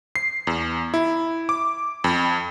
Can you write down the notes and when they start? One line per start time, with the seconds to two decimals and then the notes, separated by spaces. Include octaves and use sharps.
0.16 C7
0.47 E2
0.94 E4
1.49 D6
2.04 F2